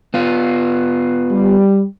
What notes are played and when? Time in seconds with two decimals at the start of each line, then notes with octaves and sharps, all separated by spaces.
0.14 B3 F4
1.31 G3